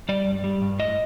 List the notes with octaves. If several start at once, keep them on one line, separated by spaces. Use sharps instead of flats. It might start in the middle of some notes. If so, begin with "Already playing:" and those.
G3 D5
G2
G3
G2
A2 D#5